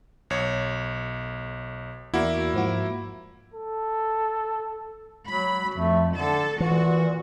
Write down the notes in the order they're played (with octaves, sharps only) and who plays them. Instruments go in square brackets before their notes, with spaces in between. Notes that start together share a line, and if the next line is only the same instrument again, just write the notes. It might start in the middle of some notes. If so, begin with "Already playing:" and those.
[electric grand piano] B1 C#5
[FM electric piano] E2 F#4 D5 [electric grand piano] A#3 E4
[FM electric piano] G#2 F3 F#4
[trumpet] A4
[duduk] F#3 [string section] B5
[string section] F2 [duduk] A3
[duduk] D3 [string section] A4
[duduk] A#2 [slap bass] E3 [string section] F#4